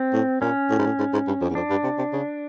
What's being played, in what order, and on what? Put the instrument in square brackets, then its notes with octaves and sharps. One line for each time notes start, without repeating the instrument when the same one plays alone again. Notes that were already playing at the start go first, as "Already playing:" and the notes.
Already playing: [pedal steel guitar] C4
[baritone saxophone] A2
[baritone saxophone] A#2 [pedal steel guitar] C#4
[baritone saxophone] A2
G#2
A2
G#2
G#2
G2
F2
E2
[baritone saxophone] F2 [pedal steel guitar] D4
[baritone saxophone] G2
C3
C3
C#3